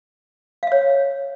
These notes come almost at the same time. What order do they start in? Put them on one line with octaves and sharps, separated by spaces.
F5 E5 C#5